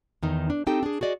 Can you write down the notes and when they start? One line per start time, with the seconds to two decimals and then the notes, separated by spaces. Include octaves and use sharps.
0.23 E2 D#3 D#4
0.50 D4
0.67 C4 D#4 G4 A4 G5
0.83 D4 G#4
1.01 F#4 G#4 D5 D#5